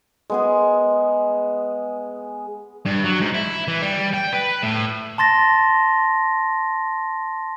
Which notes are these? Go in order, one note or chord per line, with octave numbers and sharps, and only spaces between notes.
G#3 B3 G#4
G2
F#3
G#2
E4
E3
G3
G5
B4
A2
A5 C6 A6 A#6